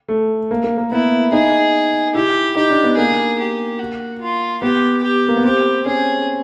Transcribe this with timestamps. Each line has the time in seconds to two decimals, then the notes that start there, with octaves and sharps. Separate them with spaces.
0.08 A3
0.51 A#3
0.64 A#3
0.77 A#3
0.91 B3 E4
1.32 D#4 G#4
2.15 E4 G4
2.56 D#4 G4
2.70 D4
2.84 B3
2.97 A#3 G#4
3.39 G4
3.79 F#4
4.21 F4
4.62 B3 G4
5.03 G4
5.28 A#3
5.36 B3
5.45 C4 G4
5.86 C#4 G#4